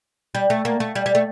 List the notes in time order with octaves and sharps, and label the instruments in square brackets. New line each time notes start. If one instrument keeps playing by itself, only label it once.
[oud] G3
A3
A#3
A3
G3
G3
A3